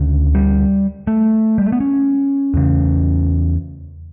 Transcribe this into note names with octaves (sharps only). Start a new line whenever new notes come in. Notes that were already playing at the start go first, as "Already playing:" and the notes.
Already playing: D2 C#3
G3
A3
G3
A3
B3
C#4
E2 C#3